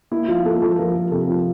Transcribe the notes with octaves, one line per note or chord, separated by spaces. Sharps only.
A#3 E4
F3 F4
A#3 A4
F3 A4
F3 A#4
F3
C3 A4
F3